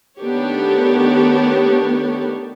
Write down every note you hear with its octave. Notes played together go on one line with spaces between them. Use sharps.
D#3 A3 B3 D4 G4 C#5